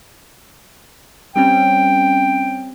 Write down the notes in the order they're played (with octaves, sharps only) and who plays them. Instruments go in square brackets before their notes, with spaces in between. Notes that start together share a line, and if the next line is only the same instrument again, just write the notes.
[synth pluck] G3 C4 C#4 [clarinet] G5